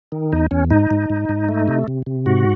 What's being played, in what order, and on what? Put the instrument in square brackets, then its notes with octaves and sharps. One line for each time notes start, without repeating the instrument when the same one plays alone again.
[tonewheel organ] D#3
E2 D#4
E2 C#4
G#2 D#4
G#2
G#2
G#2
A3
C3
C3
C3
G#2 F#4